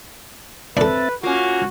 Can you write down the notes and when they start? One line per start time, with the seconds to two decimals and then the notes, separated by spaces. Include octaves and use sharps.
0.77 C4 D4 A4 B4 E5 A6
1.23 A#3 C#4 F4 F#4